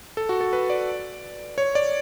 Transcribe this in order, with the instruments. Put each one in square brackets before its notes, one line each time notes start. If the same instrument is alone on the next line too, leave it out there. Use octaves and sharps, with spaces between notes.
[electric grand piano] A4
F#4
A4
B4
D5
C#5
D5